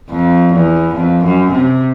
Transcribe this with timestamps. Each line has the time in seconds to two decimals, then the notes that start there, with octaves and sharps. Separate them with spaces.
0.11 F2
0.54 E2
0.95 F2
1.24 F#2
1.52 C3